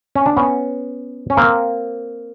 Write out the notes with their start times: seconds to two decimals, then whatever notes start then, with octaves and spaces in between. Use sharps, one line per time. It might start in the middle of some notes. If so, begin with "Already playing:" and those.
0.15 C#4
0.26 D4
0.36 B3 C#4
1.30 C#4
1.37 A#3 C4